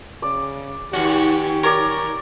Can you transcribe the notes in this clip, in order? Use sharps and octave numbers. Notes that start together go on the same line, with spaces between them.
C#3 D5
D#2 C#4 F#4 G4
A#4 C#5 D5